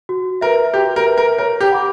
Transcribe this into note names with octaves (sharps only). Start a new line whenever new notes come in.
F#4
A#4 B4 E5
F#4 G4
A#4
B4 E5
A#4
A#4 C#5
G4
F#5 B5 D6